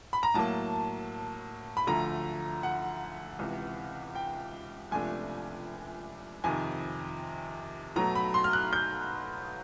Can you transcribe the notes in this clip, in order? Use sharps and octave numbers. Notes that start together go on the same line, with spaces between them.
B5
A#5
A2 F#3 A#3 A5
B5
D2 D3 F3 A3 A#5
F#5
C#2 C3 E3
G5
C#2 C3 F3 A3 D4 G#5
F2 C3 D#3 G#5
B2 F#3 A3 A#5
B5
C6
F6
F#6
G6